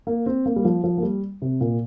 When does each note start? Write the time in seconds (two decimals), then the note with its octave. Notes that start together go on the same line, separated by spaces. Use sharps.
0.07 A#3
0.26 C4
0.46 A#3
0.56 G3
0.65 F3
0.84 F3
0.98 A#3
1.03 G3
1.42 C3
1.61 A#2